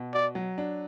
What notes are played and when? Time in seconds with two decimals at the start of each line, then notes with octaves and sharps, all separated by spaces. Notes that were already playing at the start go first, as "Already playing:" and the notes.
Already playing: B2
0.14 F#4 D5
0.35 F#3
0.58 D4